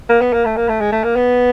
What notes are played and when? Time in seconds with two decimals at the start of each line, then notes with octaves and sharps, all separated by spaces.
0.09 A#3
0.21 B3
0.33 A#3
0.45 A3
0.57 A#3
0.69 A3
0.80 G#3
0.92 A3
1.04 A#3
1.16 B3